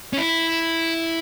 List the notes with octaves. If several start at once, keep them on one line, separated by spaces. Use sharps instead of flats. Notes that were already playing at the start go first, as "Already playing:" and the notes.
C#4
E4